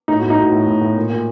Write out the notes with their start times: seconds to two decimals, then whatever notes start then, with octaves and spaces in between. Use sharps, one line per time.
0.08 A2 D#4
0.20 F#4
0.22 A2
0.30 D#4
0.38 A2 F#4
0.52 A2
0.67 A2
0.82 A2
0.96 A#2
1.10 A#2